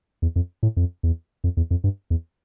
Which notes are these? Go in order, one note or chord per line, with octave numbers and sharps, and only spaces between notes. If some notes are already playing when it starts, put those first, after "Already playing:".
E2
F2
A2
F2
E2
F2
E2
F2
G2
E2